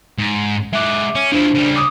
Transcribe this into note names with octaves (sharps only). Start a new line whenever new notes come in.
G#2
G#3 E5 F#5 D6
C#4
F3 D4 E4 C5
C#3 G3
D6 D#6